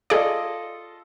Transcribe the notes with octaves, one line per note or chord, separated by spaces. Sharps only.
F4 G#4 A4 D5 D#5